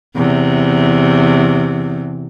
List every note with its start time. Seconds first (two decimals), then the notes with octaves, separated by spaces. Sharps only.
0.16 E2 C3